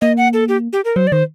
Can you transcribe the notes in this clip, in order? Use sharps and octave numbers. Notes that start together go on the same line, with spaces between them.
A#3 D#5
F#5
A4
G4
G4
A#4
F#3 C5
D5
D#3 C5